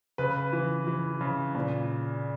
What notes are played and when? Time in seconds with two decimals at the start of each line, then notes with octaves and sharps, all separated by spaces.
0.18 C#3 B4
0.53 E3
0.87 E3
1.21 C#3
1.55 A#2